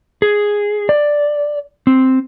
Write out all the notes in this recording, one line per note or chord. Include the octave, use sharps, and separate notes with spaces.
G#4
D5
C4